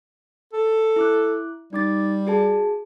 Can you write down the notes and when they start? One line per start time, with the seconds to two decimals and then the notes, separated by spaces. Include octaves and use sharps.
0.53 A4
0.96 E4 D6 F#6
1.73 G3 D#4 D6 A6
2.27 F#4 G#4 A5